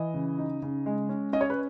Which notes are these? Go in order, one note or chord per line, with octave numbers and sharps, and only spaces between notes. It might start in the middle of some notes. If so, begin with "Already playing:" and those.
Already playing: E3 D#5
C#3
D#4
C#3
G#3
C#4
C#4 D#5
C#5
B4